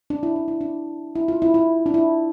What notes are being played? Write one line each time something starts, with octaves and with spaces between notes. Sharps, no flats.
D4
E4
D4
E4
D4
E4
F4
E4
E4
D4
E4